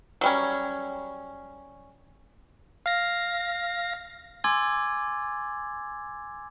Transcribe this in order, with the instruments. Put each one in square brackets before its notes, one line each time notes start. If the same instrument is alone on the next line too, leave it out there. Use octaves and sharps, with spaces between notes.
[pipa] F#3 G3 C#4
[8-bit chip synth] F5 A#6
[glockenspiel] G#5 C6 D6 E6 G#6 A6